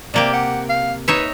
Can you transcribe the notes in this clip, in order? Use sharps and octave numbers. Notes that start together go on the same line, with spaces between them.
C3 A#3 G4 D5
F#5
F5
D#4 B4 C#5 E5